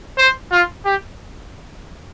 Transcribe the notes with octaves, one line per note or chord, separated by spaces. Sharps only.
C5
F4
G4